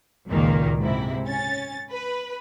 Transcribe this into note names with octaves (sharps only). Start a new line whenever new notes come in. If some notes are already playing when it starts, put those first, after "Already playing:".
C#2 F#2 A#2 D#3 A#3
G#2 C3 E4
C#4 A6
B4